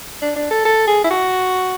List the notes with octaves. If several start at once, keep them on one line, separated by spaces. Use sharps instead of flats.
D4
D4
A4
A4
G#4
E4
F#4